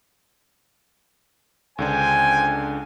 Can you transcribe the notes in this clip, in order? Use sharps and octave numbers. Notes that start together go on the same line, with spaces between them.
C#2 D3 D4 C5 G5 G#5